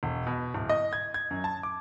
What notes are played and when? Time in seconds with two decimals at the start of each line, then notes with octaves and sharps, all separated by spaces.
0.03 E1
0.27 B2
0.54 D1
0.69 D#5
0.93 G#6
1.14 G#6
1.31 F#2
1.44 A5
1.63 D6